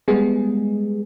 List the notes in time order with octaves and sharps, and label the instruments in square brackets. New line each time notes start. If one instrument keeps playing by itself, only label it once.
[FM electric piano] G3 G#3 B3 G#4